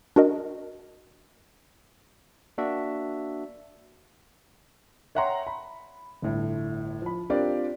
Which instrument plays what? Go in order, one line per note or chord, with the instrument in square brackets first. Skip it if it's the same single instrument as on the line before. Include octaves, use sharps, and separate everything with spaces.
[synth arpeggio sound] D4 F#4 A#4 D#5
[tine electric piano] A#3 D4 F#4 E5
[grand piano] C#5 E5 F#5 G5 A#5 C6
B5
G1 A2
F3 B5
C4 D4 F4 G4 A#4 D5